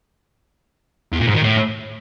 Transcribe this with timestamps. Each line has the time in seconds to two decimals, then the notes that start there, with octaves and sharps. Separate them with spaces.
1.13 E2
1.20 A#2
1.27 G#2
1.35 D#3
1.42 A2